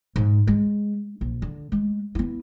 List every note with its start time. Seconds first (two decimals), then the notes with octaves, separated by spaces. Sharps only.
0.16 G#2
0.47 G#3
1.21 A#1
1.42 D3
1.72 G#3
2.15 B3 E4